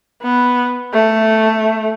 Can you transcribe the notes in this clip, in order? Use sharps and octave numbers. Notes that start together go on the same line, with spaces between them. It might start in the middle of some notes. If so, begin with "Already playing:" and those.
B3
A3